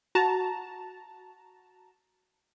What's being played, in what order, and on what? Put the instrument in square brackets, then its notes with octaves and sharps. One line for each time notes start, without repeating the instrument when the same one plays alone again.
[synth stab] F#4 A5 A#5